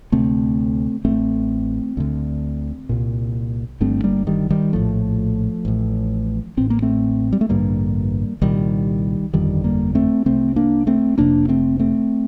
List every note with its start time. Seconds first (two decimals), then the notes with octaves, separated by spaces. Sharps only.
0.12 D2 C3 A3 C4
1.05 A1 A2 A3 C4
1.97 D2 D3
2.89 C2 A#2
3.80 G1 G2 D3 A3 C4
4.04 G3 A#3
4.27 D#3 G3
4.50 D#3 G3
4.73 A#1 A2 F3 A3
5.65 A1 A2
6.57 A1 A2 C4
6.70 A#3
6.82 A3 C4
7.32 G3
7.41 A3
7.49 A1 G2 D3 G3 A#3
8.42 C2 A#2 D#3 G3
9.33 G1 F2 D3 D#3 G3
9.64 G3 A#3
9.95 A3 C4
10.26 C2 C3 A3 C4
10.56 A#3 D4
10.87 A3 C4
11.18 F1 F2 C3 A#3 D4
11.48 A3 C4
11.79 A3 C4